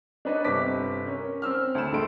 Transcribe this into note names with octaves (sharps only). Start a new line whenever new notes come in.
D4 D#4 B4 C#5 D#5
G1 C3 B4 D6 B6
C#4 A#4
C4 E6 F6
D2 B5 E7
A#1 F2 G#3 A4 C6 D7